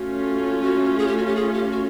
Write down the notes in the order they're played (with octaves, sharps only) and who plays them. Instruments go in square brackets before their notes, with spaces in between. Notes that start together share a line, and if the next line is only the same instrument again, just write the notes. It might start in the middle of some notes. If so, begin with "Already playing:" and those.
Already playing: [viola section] A3 C#4 F4 [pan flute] F#4
[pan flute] F#4
G#4
G4
F#4
G4
G#4
G4
F#4